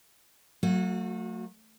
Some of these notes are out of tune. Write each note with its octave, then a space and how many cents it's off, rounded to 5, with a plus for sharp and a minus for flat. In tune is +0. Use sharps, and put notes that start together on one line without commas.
F#3 +0 A3 +35 F#4 -30